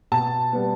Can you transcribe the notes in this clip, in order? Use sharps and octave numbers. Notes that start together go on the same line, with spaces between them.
B2 A5
G3 B3